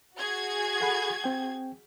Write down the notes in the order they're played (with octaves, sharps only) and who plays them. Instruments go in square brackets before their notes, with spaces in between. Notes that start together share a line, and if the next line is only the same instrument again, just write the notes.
[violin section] F#4 G#4 G#6
[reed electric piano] A4 F#5 B5
C4 G5